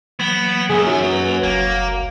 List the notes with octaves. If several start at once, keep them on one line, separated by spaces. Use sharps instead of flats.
E3 F#3 A#3 B3
C#2 F#2 G#4
F#3 D#4 F4 E5
A#3 B4
F#1 C2 A#3